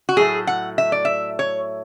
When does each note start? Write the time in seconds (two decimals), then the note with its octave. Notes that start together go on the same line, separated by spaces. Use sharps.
0.09 F#4
0.17 A2 F#3 A3 G#4
0.47 F#5
0.78 E5
0.92 D5
1.05 E5
1.39 C#5